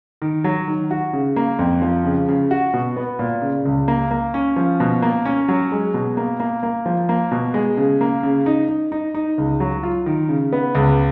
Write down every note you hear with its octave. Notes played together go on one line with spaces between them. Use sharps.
D#3
F#3
D#3
F#4
C#3
A#3
F2
F3
C#3
C#3
F#4
B2
B3
A#2
C#3
C#2
A#3
A#3
C#4
F3
B2
A#3
C#4
F#3
G#3
B2
A#3
A#3
A#3
F3
A#3
B2
G#3
C#3
A#3
C#3
D#4
D#4
D#4
D#4
C#2
F#3
F4
D#3
C#3
B3
C#2